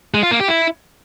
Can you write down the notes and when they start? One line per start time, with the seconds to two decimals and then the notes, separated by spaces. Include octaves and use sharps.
0.14 G#3
0.23 F4
0.31 A#3
0.40 G4
0.48 E4